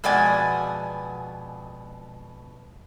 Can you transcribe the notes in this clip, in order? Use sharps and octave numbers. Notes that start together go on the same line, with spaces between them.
F2 B2 G#3 D5 F#5 G#5